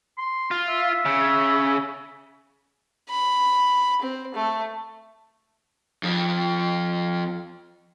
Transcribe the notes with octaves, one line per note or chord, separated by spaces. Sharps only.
C6
F4
E5
C#3
B5
C4
A3
F2 F3